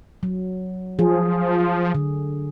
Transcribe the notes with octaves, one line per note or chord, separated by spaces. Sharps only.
F#3
F3 G#4
D3